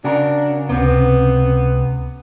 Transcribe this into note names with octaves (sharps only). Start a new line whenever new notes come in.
C#3 D4 F#4 A#4
C#2 C3 B3 C4